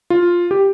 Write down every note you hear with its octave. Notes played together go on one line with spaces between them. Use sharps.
F4
G4